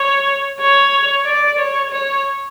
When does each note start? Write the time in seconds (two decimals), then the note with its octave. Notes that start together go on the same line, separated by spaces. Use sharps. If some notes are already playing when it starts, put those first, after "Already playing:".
Already playing: C#5
0.60 C#5
1.26 D5
1.59 C#5
1.91 C#5